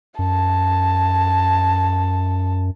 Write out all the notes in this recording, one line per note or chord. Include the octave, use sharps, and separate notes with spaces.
F#2 A5